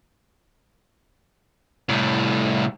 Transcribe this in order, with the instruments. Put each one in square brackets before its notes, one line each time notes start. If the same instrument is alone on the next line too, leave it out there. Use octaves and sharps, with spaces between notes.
[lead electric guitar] C2 A2